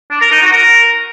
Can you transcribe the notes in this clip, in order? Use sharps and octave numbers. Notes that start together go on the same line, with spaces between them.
D4
A#4
D#4
F#4
A#4